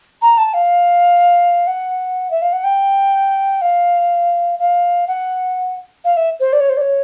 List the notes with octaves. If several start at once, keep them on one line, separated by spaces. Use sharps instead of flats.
A#5
A5
F5
F#5
E5
F5
F#5
G5
F5
F5
F#5
F5
E5
C5
D5
C#5
C5
D5
C#5